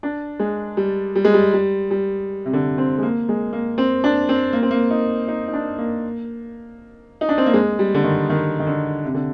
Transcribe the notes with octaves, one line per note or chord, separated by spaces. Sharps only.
D4
G#3
G3
G3
G#3
G3
G3
G3
C3
D3
C4
G#3
A#3
G#3
A#3
C4
D4
C4
A#3
C4
A#3
D#4
D#4
D#4
D4
A#3
D#4
D4
C4
A#3
G#3
G3
D3
D#3
D#3
D#3
D3
C3
D3